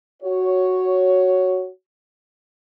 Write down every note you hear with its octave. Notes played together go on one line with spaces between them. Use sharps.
F#4 C#5